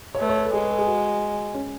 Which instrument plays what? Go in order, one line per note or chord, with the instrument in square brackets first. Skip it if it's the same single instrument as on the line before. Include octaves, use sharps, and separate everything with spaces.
[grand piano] C#5
[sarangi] A3 [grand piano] B4
[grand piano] C#5
B4
A4
[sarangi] G#3 [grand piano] G#4
[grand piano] B4
A4
G#4
F#4
C#4